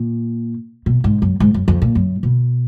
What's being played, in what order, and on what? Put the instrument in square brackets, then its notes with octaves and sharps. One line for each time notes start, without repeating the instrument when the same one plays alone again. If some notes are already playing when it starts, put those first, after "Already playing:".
Already playing: [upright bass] A#2
B2
G#2
F#2
G#2
F#2
F2
A#2
F#2
B2